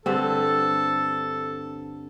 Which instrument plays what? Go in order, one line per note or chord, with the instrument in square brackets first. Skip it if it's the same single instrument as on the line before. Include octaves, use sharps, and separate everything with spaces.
[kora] G2 D3 C4 [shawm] A4